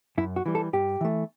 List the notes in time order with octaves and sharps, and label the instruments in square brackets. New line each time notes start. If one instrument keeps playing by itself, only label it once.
[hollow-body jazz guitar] F#2 E4
F#4
E3 G3
A4
G2 G4
E3 A3